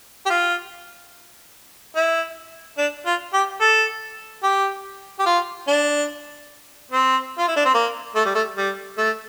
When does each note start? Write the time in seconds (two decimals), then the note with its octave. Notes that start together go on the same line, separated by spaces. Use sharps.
0.26 G4
0.30 F4
1.96 E4
2.78 D4
3.06 F4
3.33 G4
3.61 A4
4.43 G4
5.19 G4
5.26 F4
5.68 D4
6.91 C4
7.38 F4
7.48 E4
7.56 D4
7.65 C4
7.74 A#3
8.15 A3
8.25 G3
8.35 A3
8.57 G3
8.98 A3